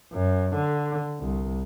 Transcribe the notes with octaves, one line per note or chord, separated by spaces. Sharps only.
F#2
D3
C2